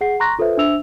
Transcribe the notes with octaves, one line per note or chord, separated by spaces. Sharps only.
G#4 F#5 C7
A#5 C6 C#6 F#6 A#6
F4 A4 B4 C5 E5
D4 C5 E5 E6 F7